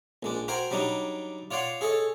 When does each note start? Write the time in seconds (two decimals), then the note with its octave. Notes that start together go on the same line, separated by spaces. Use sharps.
0.23 A#1 G#3 D4
0.48 F#4 A#4 C5 G5 G#5
0.71 F#3 G3 D4 D#4
1.51 F4 C#5 D5 F#5 C6
1.81 G#4 A4 C#5 D#5